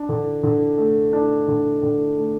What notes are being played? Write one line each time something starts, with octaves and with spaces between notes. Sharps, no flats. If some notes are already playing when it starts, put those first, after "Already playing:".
Already playing: D4
D3
D3
A3
D4
D3
D3
A3